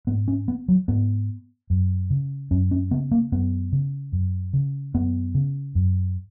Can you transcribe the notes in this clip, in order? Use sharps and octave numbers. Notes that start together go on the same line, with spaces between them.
G#2 B3
C#4
B3
F#3
G#2 B3
F#2
C#3
F#2 C#4
C#4
C#3 B3
A#3
F#2 B3
C#3
F#2
C#3
F#2 B3
C#3
F#2